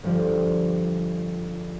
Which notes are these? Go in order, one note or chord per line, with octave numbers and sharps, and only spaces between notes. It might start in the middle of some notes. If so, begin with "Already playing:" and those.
G1 F3 G3